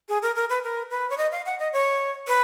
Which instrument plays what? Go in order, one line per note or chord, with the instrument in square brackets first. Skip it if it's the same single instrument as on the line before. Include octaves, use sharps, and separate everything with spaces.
[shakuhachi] G#4
A#4
A#4
B4
A#4
B4
C#5
D#5
F5
F#5
D#5
C#5
B4